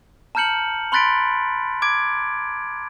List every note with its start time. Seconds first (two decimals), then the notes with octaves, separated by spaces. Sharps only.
0.35 A5 A#5 F6 G6 C#7 F#7
0.92 B5 C6 F#6 A6 B6 D7
1.82 D6 G#6 D7